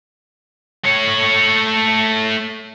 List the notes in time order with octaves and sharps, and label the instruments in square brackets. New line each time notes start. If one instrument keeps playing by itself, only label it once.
[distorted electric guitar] A3 C#5